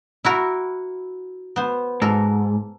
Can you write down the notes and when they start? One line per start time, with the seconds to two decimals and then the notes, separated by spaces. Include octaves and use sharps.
0.24 E4 F#4 A#4
1.56 B3 C5
2.02 G#2 A4 A#4